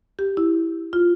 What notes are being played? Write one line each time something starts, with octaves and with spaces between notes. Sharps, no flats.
G4
E4
F4